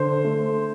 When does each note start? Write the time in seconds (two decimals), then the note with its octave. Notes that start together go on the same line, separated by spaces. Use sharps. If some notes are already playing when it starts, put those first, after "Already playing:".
Already playing: D3 C5
0.24 A3